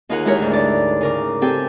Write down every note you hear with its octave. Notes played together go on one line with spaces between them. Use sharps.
D#2 D#4 F4 G#4 A#4 F#5
G#3 E4 G4 A#4 C#5
D2 G#2
D4 D5
C#3 A#4 D6
C4 G4 A4 G5 G#5